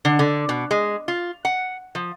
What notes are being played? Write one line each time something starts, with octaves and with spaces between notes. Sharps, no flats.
D3
D3
B2
G#3
F4
F#5
F3